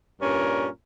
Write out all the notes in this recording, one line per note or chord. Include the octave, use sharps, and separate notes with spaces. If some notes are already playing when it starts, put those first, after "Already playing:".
G2 A#2 C#4 A#4